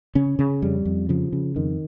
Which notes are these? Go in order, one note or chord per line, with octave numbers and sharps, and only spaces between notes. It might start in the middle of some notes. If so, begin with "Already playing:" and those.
C#3 C#4
C#3
F2 G3
F2
C#3 F3
C#3
F2 D#3